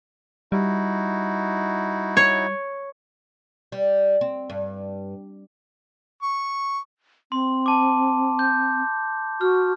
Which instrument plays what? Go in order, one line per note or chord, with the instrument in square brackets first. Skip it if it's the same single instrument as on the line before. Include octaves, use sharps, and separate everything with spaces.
[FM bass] G3 [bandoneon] D#4 E4 F#4
[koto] C#5
[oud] G3
C4
G2
[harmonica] C#6
[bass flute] C4 [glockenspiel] C6
[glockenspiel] A5 D6
G6
[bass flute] F#4 [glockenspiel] F6